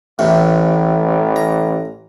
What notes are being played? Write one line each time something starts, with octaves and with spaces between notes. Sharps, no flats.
A1 E2 A2 C3
A#5